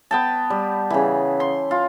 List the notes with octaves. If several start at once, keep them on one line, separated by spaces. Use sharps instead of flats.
B3 G5 A5
G3
C#3 E3
C6
F4